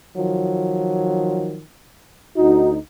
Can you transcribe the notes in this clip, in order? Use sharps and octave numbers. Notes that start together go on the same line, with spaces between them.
D#3 F3 F#3
D2 D#4 F#4